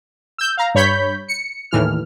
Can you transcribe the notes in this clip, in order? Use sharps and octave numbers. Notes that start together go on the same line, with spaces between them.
E6 G6
F5 A#5
G2 C#5 B5 G6 B6
C#7
D#2 A2 E3 F6